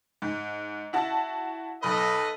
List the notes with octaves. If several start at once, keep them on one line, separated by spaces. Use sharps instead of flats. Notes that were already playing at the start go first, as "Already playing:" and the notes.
G#2
E4 F#4 A5
B1 A4 B4 D#5 B5